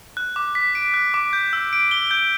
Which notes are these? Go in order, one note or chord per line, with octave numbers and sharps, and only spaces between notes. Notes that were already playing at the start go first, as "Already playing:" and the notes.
F#6
D6
B6
D7
F#6
D6
G6
E6
D7
G7
G6